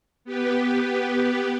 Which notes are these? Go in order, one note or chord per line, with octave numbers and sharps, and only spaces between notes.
B3 G4 B4